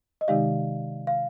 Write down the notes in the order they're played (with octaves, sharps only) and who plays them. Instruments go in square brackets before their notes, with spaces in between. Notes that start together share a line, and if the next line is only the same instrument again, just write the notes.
[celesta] D#5
[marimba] C3 D#3 G#3 D#4 G4 [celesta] D5 F5
[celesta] F5